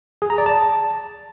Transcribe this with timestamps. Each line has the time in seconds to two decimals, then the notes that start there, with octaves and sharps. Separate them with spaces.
0.22 G#4
0.30 A#5
0.38 D5
0.46 A5